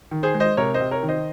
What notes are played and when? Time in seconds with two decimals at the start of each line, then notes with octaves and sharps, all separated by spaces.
0.11 D#3
0.23 G#4 C5
0.34 G#3
0.40 C5 D#5
0.57 C3 A#4 C#5
0.74 C5 D#5
0.80 C3
0.91 A#4 C#5
1.03 D#3
1.09 C5 D#5